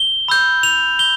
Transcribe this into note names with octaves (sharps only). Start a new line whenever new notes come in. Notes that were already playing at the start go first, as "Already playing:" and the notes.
Already playing: G7
B5 E6 G6
F7
G7